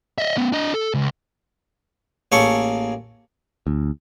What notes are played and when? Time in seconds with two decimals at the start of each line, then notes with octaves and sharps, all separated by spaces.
0.18 D#5 E5
0.38 B3 C#4
0.52 D4 D#5
0.74 A4
0.94 C#2
2.32 A1 A#3 G#4 A4 C#5 C#6
3.67 D2